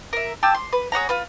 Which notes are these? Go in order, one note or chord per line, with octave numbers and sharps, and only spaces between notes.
A#4 E5
G4 A5 E6
C6
B4
G#4 C#5 F#5 A#5
F4 B4